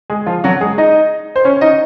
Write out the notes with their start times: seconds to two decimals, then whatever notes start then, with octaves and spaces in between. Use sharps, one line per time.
0.10 G#3 G#4
0.26 F3 F4
0.44 F#3 F#4
0.61 G#3 G#4
0.78 D#4 D#5
1.36 C5
1.44 C#4 C#5
1.61 D#4 D#5